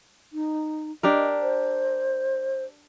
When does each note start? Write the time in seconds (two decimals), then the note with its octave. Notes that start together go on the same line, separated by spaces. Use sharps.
0.33 D#4
1.03 D4 G4 A#4 D#5
1.42 C5